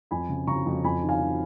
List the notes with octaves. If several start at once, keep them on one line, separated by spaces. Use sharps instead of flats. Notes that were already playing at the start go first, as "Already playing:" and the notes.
F2 G#5 B5
C#3
C#3 A#5 C#6
F2
F2 G#5 B5
D#3
F5 G#5
D#3